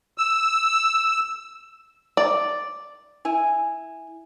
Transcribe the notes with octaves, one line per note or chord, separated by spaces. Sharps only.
E6
D5
E4 G#5